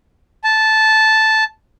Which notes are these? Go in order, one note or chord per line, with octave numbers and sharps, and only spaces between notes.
A5